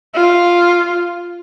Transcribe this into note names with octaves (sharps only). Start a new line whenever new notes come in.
F4